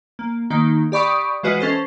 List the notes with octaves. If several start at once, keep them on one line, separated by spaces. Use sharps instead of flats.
A#3
D#3 A#3 D#4
G4 D5 B5 C#6 D#6
E3 G#3 F4 F#4 B4 D#5
C#4 A4 C5